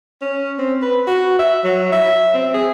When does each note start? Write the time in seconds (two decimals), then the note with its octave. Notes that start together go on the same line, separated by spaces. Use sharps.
0.22 C#4
0.59 C4
0.82 B4
1.07 F#4
1.39 E5
1.64 F#3
1.92 E5
2.34 C4
2.55 G#4